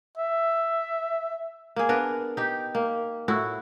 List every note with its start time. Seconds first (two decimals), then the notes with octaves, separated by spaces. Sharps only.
0.17 E5
1.76 A#3 G#4
1.89 B3 D4 A#4 B4
2.37 D#4 G4
2.75 A#3
3.28 A2 E4 F#4